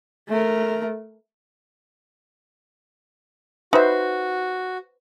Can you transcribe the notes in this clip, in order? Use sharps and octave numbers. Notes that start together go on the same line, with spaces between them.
A3 A#4
D#4 F#4 B4 C5 E5